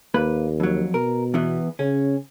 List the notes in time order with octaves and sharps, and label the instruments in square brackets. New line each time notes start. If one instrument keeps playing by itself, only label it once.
[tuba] D#2 [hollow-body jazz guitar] A#3 B4 B5
[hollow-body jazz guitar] F2 F#3
[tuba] B2 [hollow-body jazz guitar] A#4
[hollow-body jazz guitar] E2 E3 B3
[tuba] C#3 [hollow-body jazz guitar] C#4